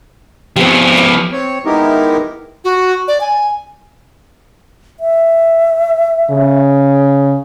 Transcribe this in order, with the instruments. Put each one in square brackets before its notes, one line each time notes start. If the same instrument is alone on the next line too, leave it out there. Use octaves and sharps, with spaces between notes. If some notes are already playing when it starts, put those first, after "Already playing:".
[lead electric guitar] F3 B3 [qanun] C4 G4
[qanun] F5 C#6 D6
[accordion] C4 C#5
G#3 B3 D#4 E4 G4 A#4
[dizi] F#4
D5
G#5
[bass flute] E5
[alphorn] C#3